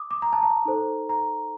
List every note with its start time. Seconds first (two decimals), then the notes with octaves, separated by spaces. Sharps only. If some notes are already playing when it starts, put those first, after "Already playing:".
Already playing: D6 D#6
0.11 D6
0.22 A#5
0.33 A5
0.43 A#5
0.65 D#4 A4 C5
1.09 A#5